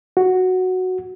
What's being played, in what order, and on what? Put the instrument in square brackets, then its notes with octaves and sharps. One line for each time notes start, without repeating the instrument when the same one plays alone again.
[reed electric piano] F#4